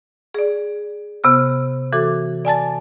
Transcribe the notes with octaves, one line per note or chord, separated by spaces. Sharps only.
G#4 D5
C3 B3 F6
E3 F#4 A4 D6
D5 G#5 A5 A6